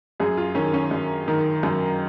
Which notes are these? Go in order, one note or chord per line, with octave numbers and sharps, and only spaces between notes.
F#2 G#4
F4
D#3 C#4
C#4
F#2
D#3
F#2